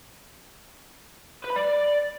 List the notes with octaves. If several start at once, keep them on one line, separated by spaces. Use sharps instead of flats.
B4
B5
D5